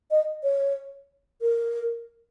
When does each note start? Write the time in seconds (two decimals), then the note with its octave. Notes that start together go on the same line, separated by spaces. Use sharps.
0.11 D#5
0.43 C#5
1.42 A#4